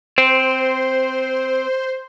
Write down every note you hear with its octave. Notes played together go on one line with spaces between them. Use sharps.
C4 C5